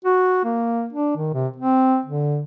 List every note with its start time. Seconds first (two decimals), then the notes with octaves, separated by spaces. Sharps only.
0.05 F#4
0.44 A#3
0.93 D4
1.17 D#3
1.34 C3
1.56 C4
2.05 D3